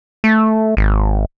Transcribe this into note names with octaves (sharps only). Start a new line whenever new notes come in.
A3
G#1